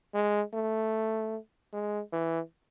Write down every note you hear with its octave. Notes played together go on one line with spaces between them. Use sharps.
G#3
A3
G#3
E3